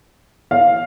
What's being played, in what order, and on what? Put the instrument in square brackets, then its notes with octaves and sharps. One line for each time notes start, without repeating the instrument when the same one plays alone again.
[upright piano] F5